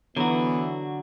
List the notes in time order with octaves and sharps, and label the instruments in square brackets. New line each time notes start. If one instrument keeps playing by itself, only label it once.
[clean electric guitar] D3 F#4 [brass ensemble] E3 [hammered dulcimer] F#3 [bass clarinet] B3